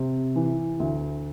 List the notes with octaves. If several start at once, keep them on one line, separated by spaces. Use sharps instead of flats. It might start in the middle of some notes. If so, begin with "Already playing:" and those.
Already playing: C3
E3
D2